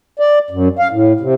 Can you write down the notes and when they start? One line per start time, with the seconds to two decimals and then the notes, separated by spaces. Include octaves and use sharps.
0.20 D5
0.51 F#2
0.79 F5
0.91 A2
1.20 C3